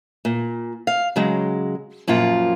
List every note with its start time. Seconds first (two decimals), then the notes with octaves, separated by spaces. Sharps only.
0.25 A#2
0.87 F5
1.16 C#3 F#3 G#3
2.08 F#2 A#2 F3 F4